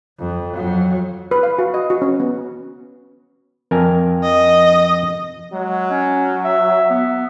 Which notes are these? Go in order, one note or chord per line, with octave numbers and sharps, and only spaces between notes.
F2
F2 F#3
B4
F5
F#4
D#5
F#4
C#4
B3
F2 A#4 G#5
D#5
F#3 G#3
C#4
E5
B3